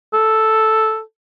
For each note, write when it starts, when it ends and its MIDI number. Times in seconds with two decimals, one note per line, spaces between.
0.13 1.00 69